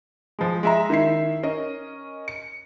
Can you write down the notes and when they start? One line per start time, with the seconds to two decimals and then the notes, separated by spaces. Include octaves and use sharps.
0.39 F3 G#3
0.63 G#3 E5 A#5
0.90 D#3 E4 E5 C7
1.43 C#4 A#4 D#5
2.28 C#7